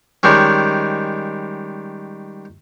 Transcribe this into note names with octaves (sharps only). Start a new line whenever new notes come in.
D#3 G3 G#3 C#4